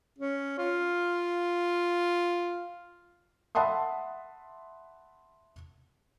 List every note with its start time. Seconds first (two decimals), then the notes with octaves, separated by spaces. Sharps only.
0.19 C#4
0.58 F4
3.55 E5 F#5 A5 B5 C6 D#6